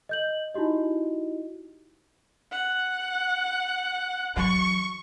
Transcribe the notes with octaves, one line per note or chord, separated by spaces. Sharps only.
D#5 G6 F#7
D#4 E4 F#4 G4 D#5
F#5
E3 F#3 C#6